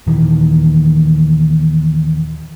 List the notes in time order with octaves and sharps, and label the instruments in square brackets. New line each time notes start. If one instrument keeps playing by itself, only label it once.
[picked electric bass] D#2 A#2 D#3 E3